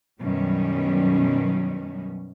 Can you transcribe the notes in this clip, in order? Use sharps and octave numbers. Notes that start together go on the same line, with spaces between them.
F#2 B2 D#3 G3 C#4